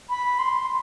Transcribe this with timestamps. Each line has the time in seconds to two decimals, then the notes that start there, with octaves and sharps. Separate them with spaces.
0.10 B5
0.39 C6